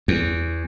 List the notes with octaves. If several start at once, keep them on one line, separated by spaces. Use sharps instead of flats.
E2